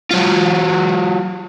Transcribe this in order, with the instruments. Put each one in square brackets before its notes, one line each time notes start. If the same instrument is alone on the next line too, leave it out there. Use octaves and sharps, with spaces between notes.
[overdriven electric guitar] F#3 F4